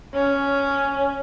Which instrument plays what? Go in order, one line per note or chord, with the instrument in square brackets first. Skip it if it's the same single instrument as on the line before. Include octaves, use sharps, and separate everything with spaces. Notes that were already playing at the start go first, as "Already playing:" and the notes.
[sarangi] C#4